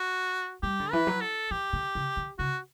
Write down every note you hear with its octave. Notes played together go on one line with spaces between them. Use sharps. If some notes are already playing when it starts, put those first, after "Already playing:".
Already playing: F#4
G3 G4
D3
E3 B4
F#3
A4
E3 G4
D3
C#3
D3
C#3 F#4